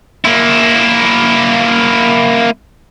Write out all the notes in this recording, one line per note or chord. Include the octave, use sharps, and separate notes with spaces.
A#3 E4